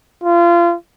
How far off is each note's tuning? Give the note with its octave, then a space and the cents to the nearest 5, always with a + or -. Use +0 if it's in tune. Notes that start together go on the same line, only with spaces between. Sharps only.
F4 -30